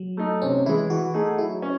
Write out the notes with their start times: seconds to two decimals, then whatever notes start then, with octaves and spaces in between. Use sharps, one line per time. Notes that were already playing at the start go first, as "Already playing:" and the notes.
Already playing: F#3
0.17 A3 D#4
0.42 C3 C#4
0.66 E3 G#3 E4
0.90 E3 F#4
1.14 A3 D#4 G#4
1.38 F#3 E4
1.62 C#4